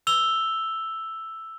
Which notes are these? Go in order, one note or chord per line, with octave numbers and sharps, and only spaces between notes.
E6 F7 G7